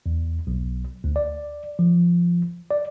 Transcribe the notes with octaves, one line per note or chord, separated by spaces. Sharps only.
E2
B1
D2
D5
F3
D5